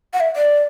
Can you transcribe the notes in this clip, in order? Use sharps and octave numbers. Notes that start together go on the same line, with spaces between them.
F#5
E5
D5